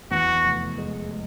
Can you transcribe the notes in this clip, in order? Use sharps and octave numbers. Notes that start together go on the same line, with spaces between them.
E2 F#4
F1
G#3
G#3